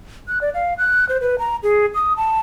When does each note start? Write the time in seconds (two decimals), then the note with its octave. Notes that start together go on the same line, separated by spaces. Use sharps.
0.28 F#6
0.41 D5
0.54 F5
0.78 F#6
1.09 C5
1.21 B4
1.39 A#5
1.63 G#4
1.95 D#6
2.17 A5